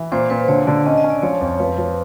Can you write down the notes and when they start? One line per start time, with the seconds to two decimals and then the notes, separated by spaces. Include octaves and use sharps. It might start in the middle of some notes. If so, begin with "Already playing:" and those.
Already playing: E3
0.12 A#2 C5
0.30 A#2 B4
0.40 C5
0.48 D3 C#5
0.67 D3 D5
0.86 C#4 D#5
0.98 D#5
1.04 C#4
1.10 D5
1.23 F3 C#5
1.35 C#5
1.41 F2
1.47 C#5
1.60 F3 B4
1.78 F3